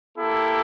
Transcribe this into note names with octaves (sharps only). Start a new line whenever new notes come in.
A#3 E4 G4 A4